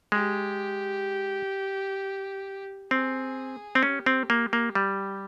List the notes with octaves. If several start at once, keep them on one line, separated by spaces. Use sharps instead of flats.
G#3 G4
C4 G#4
C4
C#4 G4
C4
A#3
A#3
G3